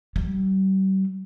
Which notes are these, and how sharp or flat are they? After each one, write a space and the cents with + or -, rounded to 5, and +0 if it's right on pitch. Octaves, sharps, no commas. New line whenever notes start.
G3 -40